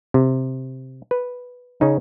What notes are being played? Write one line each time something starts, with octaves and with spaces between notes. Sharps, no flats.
C3
B4
C#3 C#4 D#4